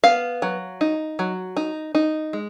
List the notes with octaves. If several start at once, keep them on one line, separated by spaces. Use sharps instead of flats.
B3 F5
F#3
D#4
F#3
D#4
D#4
G#3